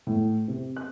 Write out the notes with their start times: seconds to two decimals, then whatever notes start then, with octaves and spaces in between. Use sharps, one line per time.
0.07 A2
0.48 C3
0.76 F#6